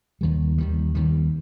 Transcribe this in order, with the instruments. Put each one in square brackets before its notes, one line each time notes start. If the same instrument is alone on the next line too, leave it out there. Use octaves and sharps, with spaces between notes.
[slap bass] D#2 D#3 G3
D#2 D#3 G3
D#2 D#3 G3